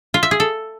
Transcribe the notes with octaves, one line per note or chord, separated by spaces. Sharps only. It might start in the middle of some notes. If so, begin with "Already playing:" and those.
F4
E5
G#4
A4